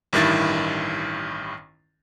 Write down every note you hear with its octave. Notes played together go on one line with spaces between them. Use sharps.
A1 G2 D#3 E4 A6